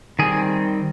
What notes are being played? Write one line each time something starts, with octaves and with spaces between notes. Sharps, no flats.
D#3 G3 C4 G#4